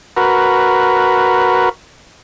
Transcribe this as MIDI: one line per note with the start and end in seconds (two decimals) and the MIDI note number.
0.17 1.69 66
0.17 1.69 70
0.17 1.69 71